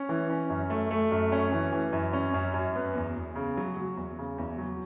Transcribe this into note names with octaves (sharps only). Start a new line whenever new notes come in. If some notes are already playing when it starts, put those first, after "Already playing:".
Already playing: C#4
E3
C#4
F#2
A3
A3
F#2
C#4
E3
E3
F#2
C#4
F#2
F#2
B3
E2
E2
C#3
F#3
F#3
E2
C#3
E2
F#3